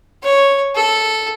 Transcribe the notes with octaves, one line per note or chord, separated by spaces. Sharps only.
C#5
A4